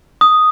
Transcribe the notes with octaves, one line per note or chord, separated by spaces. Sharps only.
D#6